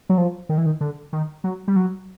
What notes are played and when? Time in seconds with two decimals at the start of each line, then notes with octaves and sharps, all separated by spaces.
0.09 F#3
0.18 F3
0.49 D#3
0.58 E3
0.66 D#3
0.81 D3
1.13 D#3
1.44 F#3
1.68 G3
1.76 F#3